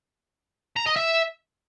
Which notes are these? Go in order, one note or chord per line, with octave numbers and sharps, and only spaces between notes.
A#5
D#5
E5